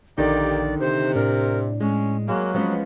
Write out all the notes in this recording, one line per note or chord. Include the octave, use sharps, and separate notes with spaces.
A#1 D3 D#3 A#3 D#4 G4 D5
C3 C5
A2 D4 A#4
G#3 C#4
F#3 G#3 A#3
F3 G#3 B3 C#4